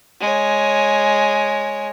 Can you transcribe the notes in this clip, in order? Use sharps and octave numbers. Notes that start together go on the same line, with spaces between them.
G#3 C#5